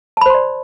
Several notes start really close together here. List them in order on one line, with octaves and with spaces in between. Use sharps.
A5 B5 C5 C6 D5